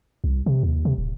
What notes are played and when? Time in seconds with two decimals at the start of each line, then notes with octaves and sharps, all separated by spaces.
0.24 C2
0.46 C3
0.63 D#2
0.85 C3
0.98 D1